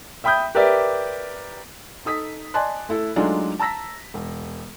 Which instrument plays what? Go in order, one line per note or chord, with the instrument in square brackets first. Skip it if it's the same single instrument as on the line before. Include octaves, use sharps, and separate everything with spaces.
[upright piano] E5 G5 B5 D#6 G6
G4 A#4 B4 D5 E5
[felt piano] D#4 A4 D#6 B6
D5 D#5 G#5 A5 C6 F#6
A3 E4 A4
F#3 G#3 A3 D4 D#4 F4
A5 A#5 E6 A#6 B6
E1